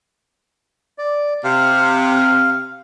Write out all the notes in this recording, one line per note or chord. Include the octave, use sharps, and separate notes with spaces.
D5
C3 F5